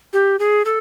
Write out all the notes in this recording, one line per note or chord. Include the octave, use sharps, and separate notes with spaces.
G4
G#4
A4